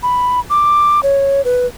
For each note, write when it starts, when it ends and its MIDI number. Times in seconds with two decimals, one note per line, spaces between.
0.03 0.40 83
0.50 1.00 86
1.03 1.44 73
1.45 1.67 71